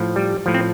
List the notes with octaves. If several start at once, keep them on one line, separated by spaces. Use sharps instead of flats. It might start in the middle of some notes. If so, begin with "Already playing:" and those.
Already playing: A2 F3
G3
A2 F3
C4